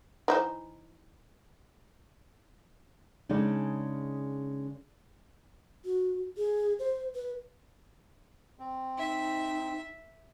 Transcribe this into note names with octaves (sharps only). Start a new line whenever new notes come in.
E3 D#4 C5
C#3 G#3 D4 D#4
F#4
G#4
C5
B4
C4
D#4 E5